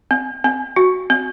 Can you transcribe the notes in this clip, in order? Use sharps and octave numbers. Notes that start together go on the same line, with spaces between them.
C4
C4
F#4
C4